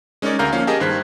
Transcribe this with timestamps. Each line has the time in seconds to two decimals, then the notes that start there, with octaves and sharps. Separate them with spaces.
0.22 G#3 C#4 D#4 A#4 C#5 D5
0.39 D2 A#4 F5 A#5 F6 G6
0.53 F3 A#3 C#4 F5
0.67 G4 G#4 A#4 D#5 A5
0.80 G2 D#3 C5 F#6 G#6 B6